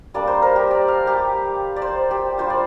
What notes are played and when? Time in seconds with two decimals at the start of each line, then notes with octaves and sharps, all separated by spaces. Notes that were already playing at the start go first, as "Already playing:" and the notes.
0.14 G3 A#3 D4 D5
0.27 C5
0.42 A#4
0.56 G4
0.71 D5
0.88 F5
1.07 G4
1.76 D5
1.82 C5
2.11 G4
2.38 G3 D4 F4 C5
2.50 D5